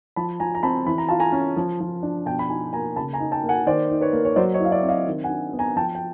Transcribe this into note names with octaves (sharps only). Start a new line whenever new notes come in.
F3 A5 B5
F3 G#5 A#5
A#5
C4 A5 B5
E3 B5
A#5
F4 A5
G#5 A#5
C#4
F3
F3
D4
B2 G5 A5
B5
D#4 G#5 A#5
A#3 G#5 A#5
C#3 A5 B5
G#5 A#5
D#4
G5 A5
A#3
F#5 G#5
D#3 C5 D5
D#4
B4 C#5
A#3
C#5
F#3 C5 D5
C#5 D#5
E4 F5
D5 E5
C4
D#5 F5
D#3
F#5 G#5
D4
B3
G#5 A#5
F3 G5 A5
G5